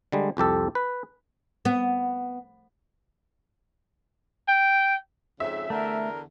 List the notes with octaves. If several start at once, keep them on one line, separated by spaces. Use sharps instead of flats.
D3 G3 G#3
C2 F2 G4 A4
B4
B3
G5
F2 G#2 C#3 E5
E2 D3 A3 A#4